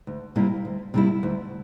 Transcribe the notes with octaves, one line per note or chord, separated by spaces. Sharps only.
D2
C3 G3 A#3 E4
D2
C3 G3 A#3 E4
D2